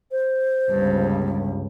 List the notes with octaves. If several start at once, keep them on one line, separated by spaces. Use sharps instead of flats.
C5
G1 C#2 G2